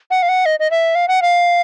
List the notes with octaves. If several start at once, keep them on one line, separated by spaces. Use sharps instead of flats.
F#5
F5
F#5
D#5
D#5
E5
F5
F#5
F5